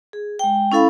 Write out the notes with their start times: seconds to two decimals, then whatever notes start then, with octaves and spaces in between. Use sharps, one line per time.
0.13 G#4
0.39 G#3 G5
0.72 C#4 E4 A4 F5 B5